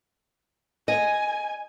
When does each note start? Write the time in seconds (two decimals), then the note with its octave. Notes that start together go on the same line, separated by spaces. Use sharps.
0.88 D#5 G#5